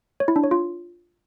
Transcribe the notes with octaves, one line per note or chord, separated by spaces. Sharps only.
C#5
E4
D4
C#5
F4